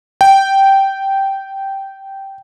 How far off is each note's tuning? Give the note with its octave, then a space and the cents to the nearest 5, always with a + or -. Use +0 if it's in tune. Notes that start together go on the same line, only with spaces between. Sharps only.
G5 -10